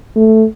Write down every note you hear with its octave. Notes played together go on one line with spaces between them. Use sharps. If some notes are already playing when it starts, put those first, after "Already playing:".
A3